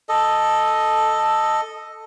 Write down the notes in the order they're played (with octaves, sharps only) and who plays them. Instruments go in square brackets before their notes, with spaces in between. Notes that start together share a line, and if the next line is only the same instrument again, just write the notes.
[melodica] A4 D#5